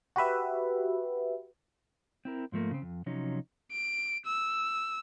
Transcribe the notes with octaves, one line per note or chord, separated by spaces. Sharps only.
F#4 G4 B4 E5
C4 E4 A#4
G#2 F3 A3 A#3
C#3 C4
F2
C3 F3 F#3 C#4 D#4
D7
E6